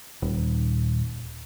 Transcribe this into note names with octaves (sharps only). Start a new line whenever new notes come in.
D#1